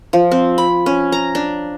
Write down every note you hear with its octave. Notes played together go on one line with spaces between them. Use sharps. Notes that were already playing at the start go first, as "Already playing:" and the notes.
F3
C4
B5
C#4
A#5
D4